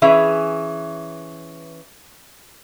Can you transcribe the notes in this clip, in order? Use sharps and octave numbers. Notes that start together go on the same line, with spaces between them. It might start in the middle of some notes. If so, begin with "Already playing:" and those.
E3 C#4 G#4 E5